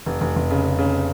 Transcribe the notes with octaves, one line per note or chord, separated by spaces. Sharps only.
F1
F1
F1
C#3
C#3
C#3